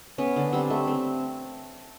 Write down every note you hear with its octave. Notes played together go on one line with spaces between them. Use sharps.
B3 C#4
D3
G3 C4
A3
C4